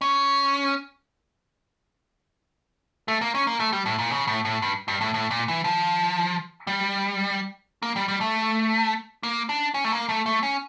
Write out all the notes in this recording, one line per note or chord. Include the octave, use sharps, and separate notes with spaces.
C#4
A3
A#3
C#4
A#3
A3
G3
A2
A#2
C#3
A2
A2
G2
G2
A2
A2
A#2
E3
F3
G3
A#3
G3
G3
A3
A#3
D4
C#4
A3
A#3
A3
A3
C#4